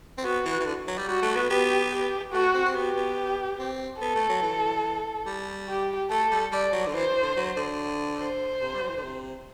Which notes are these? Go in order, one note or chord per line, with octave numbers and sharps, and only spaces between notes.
C4
B3 F#4
E3
E3
D3
F#3
G3
G3 F#4
A3
B3
B3 G4
G4
A3 F#4
C4
C4
B3 G4
B3
C4
B3 A4
A3
F#3
E3
G3
G4
A3 A4
G3
G3 D5
F#3
D3
E3 C5
D3
F#3
D3
C5
C3
G3
F#3
E3
D3
C3